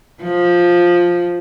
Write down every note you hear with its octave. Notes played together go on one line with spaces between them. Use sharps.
F3